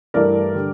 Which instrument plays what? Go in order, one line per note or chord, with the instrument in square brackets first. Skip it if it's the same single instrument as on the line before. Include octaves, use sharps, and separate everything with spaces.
[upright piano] G2 E3 A3 A#4 D5
D3 G3